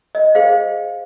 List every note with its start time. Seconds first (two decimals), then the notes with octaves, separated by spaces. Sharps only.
0.15 D#5
0.35 G#4 C5 F5